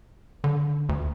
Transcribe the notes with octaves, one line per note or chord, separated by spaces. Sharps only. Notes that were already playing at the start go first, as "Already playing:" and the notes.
D3
D2